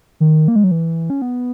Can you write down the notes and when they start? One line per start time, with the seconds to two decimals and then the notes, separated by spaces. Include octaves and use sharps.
0.20 D#3
0.48 A#3
0.56 G#3
0.64 F#3
0.71 E3
1.10 C#4
1.22 B3